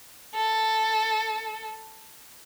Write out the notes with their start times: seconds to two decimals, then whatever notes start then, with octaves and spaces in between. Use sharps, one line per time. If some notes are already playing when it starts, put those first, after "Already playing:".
0.34 A4